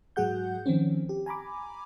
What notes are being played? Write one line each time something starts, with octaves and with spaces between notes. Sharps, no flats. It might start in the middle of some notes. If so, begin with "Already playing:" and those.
G#2 F#3 F#4 G#4 F#5 G6
D#3 F3 C4 C#4
G4
G#5 A#5 B5 D6